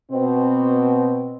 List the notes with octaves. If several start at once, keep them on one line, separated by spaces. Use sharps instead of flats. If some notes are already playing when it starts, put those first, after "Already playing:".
B2 C4